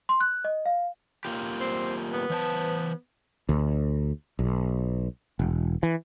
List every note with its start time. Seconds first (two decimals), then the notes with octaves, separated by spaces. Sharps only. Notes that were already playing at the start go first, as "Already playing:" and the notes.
0.09 C6
0.21 F#6
0.45 D#5
0.66 F5
1.25 A#3 F4 G4
1.61 C4
2.13 B3
2.30 E3 C5 A5
3.49 D2
4.39 B1
5.39 E1
5.83 E3